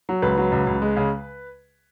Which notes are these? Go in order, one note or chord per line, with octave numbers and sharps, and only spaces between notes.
F#3
C#2 B4
F#3
C#2
C#2
G#3
C#3